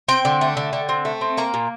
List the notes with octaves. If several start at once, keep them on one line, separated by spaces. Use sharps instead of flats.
C4 G5
D3
A3
D3
D3
C4
A3
C4
A#3 A#5
A#2